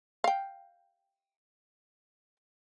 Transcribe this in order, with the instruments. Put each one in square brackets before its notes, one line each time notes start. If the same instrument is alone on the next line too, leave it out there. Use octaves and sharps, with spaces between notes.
[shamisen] F5 G5